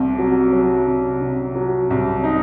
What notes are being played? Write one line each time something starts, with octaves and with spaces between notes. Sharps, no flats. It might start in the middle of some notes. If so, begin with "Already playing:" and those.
Already playing: C2 C3
F#3
F#3
C3
C3
F#3
C2
D#4